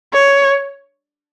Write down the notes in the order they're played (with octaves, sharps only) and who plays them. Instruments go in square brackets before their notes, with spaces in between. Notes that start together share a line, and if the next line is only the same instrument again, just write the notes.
[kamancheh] C#5